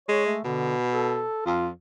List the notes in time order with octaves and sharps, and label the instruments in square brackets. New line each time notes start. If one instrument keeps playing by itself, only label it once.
[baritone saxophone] G#3 [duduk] C#5
[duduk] A3
[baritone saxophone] B2 [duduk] D3
[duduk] A4
[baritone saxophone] F2 [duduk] F4